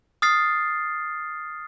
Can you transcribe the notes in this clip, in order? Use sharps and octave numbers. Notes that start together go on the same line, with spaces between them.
D#6 F6 A6 C7